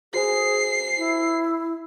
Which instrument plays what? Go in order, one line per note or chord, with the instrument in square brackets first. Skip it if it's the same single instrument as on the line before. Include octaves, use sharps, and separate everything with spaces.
[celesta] F#4 C5 G#5 [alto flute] G#4 [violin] C7
[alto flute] E4